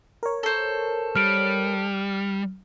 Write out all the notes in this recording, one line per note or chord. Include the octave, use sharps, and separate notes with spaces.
A#4 C#5
A4 C5
G3 F6 D7